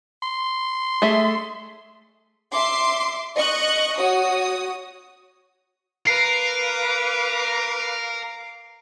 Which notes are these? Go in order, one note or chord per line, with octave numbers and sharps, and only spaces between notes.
C6
A3 G#4 E5
E5 C6 D6
D#5 C#6 F#6
F#4 C#5 D#6
A#4 B4 F5 D6 C7